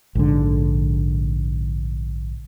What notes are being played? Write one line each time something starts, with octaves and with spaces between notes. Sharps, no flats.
A#1 G#2 D3